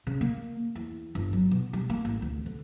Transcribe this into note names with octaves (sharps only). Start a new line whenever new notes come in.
C#3
A#3
E2
G1
F#3
B2
G3
A#3
A1
D2
D3